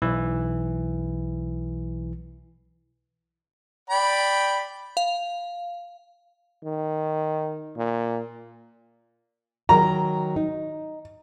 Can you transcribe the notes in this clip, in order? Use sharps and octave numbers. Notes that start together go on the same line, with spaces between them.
B1 E3
D5 G5 B5
F5
D#3
A#2
D#3 F#3 A#4 A#5
D#4